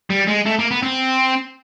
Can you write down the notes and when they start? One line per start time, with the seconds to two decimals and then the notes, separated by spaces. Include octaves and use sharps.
0.10 G3
0.27 G#3
0.46 A3
0.59 A#3
0.71 B3
0.82 C4